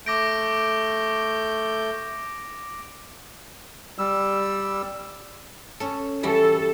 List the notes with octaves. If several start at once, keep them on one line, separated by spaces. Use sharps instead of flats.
A3 D6 G6 A#6 D7
G3 E6
C#4 A4
E3 G3 F#4 A4